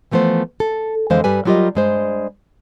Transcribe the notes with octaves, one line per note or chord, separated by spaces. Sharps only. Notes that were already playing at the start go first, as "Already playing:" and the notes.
E3 F3 A3 B3 C5
A4
F2 D3 E3 G#3 C5 F5
G2 G3 B4 G#5
F#3 G3 F4 G4 A#4 D#5
G2 G#3 C5